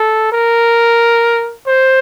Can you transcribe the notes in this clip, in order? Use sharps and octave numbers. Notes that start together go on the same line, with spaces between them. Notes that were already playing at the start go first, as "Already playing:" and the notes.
Already playing: A4
A#4
C5